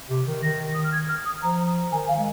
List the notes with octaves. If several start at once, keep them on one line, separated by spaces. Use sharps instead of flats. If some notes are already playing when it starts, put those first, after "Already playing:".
C3
D#3
D#3 A#6
D#6
F6
G#6
F6
D#6
F3 A#5
D#3 G#5
F5
G#3